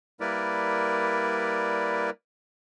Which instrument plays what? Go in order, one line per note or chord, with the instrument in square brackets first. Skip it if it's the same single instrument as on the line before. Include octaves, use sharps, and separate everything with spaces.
[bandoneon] G3 A#3 E4 A#4 B4 D5